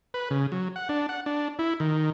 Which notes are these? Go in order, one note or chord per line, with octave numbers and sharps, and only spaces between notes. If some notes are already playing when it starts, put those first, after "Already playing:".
B4
C#3
F#3
F#5
D4
F#5
D4
E4
D#3